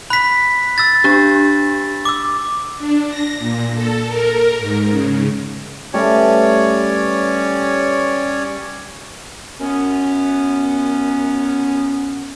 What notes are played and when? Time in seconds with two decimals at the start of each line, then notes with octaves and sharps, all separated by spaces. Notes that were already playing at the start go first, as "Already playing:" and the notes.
0.10 B5 F#6 B6
0.78 E6 A6
1.04 D4 G4
2.05 D6 E6
2.78 D4
3.09 A#6
3.38 A#2
3.74 A4
4.08 A#4
4.59 G#2
4.91 C#3
5.94 G3 A3 C#4 B4 C#5 D5
9.61 F#2 B3 C#4